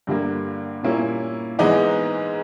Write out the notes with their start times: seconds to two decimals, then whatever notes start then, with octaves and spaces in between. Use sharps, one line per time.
0.07 G2 D3 G3 A#3
0.83 A#2 G3 A#3 C#4 E4
1.59 G#2 E3 G#3 B3 D#4